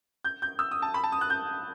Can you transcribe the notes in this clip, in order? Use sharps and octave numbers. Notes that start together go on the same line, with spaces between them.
G6
G6
E6
D#6
A5
B5
A5
D#6
F#6
G6